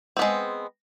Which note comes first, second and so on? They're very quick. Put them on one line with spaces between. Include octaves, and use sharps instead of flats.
C4 B3 G#3